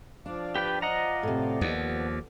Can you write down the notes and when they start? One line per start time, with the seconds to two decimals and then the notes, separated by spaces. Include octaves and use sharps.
0.26 F3 D4 D5 F5
0.55 G4 B4 G5
0.82 D#5 F#5 A#5
1.23 A2 C3
1.61 D#2 B3